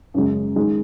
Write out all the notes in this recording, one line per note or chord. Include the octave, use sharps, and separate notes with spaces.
F#2 C#3 G#3
D#3 G#3